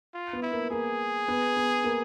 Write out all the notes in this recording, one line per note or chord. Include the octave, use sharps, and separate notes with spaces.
F4
B3
E4
A#3
A#3 G#4
B3
B3
A#3